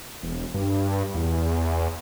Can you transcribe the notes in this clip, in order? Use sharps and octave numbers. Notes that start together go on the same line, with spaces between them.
E1
G2
E2